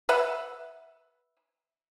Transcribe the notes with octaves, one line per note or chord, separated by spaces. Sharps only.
B4 E5 F#5